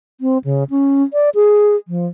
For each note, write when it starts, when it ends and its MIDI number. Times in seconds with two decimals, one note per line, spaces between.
0.21 0.38 60
0.44 0.64 49
0.70 1.03 61
1.13 1.30 74
1.35 1.76 68
1.88 2.07 53